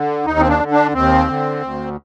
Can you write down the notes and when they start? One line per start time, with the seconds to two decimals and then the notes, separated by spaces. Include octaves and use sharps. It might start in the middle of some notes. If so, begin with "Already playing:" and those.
Already playing: D3
0.26 D#2 D#4
0.39 C4
0.48 D4
0.59 D3
0.71 D4
0.94 D#2 C4
1.28 D3
1.62 D2